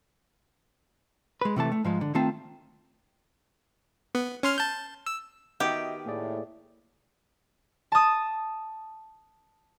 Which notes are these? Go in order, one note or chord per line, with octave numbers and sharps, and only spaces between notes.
G#3 B4
C3 E3 A3 A5
A3
G#2 F3 G#3
D3
D#3 A3 C4 F4 A5
B3
C#4 C6 F6
A5 G6
E6
D#3 B3 F#4 G4 D#5 E5 F#5
A2 A#3 G#4 D5
A5 D#6